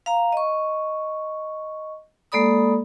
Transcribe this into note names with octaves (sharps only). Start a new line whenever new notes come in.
F5 A#5
D#5 C#6
G#3 A#3 A4 D5 B5 D#6